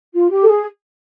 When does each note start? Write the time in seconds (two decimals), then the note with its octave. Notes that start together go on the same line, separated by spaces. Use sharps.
0.14 F4
0.31 G4
0.43 A4
0.47 G#4